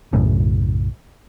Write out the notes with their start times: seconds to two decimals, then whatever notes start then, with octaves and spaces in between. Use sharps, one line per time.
0.13 B1 F#2 A2 C#3